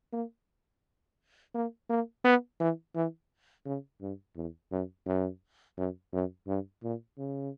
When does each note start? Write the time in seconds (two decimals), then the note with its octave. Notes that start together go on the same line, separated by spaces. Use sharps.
0.13 A#3
1.55 A#3
1.90 A#3
2.24 B3
2.60 E3
2.95 E3
3.66 C#3
4.01 G2
4.36 E2
4.72 F#2
5.06 F#2
5.77 F#2
6.13 F#2
6.47 G2
6.83 A#2
7.18 C#3